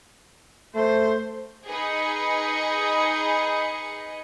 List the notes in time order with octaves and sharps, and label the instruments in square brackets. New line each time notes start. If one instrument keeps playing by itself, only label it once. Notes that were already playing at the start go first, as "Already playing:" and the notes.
[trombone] A3 [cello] C5
[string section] D#4 G#4 B4 D#5 C#7